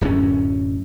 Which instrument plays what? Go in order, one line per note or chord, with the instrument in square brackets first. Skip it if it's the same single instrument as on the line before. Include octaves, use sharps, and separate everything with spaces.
[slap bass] D1 F#2 A2 C#4